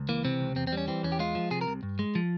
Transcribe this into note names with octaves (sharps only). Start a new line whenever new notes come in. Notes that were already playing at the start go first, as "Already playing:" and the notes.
Already playing: C#2
E3 A#3
C3 C4
C#2
E2 C4
C4
G3
C#4
E3 C4
E2 C#4
G4
G#3 F4
F3
C3 G#4
A#4
C2
G2
G#3
F3